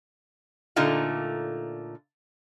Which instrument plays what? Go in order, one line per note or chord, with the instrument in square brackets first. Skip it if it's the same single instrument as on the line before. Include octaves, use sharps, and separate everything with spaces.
[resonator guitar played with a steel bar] A#2 D3 A3 D#4 F4